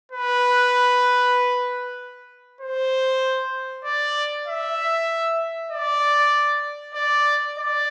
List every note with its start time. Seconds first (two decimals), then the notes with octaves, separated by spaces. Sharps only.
0.12 B4
2.61 C5
3.85 D5
4.47 E5
5.72 D5
6.95 D5
7.58 D5